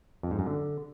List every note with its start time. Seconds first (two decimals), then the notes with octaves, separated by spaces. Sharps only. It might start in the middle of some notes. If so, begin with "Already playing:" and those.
0.23 F2
0.31 G#2
0.39 F#2
0.47 D3